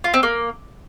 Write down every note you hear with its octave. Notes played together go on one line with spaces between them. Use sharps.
F4
C4
A#3